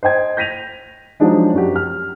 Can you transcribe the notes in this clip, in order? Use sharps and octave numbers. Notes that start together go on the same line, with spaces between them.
C5 D#5 G5 G#6
G6 A#6 B6 D#7 F7
F3 F#3 G#3 D4 D#4
F#2 F#4 G4
F6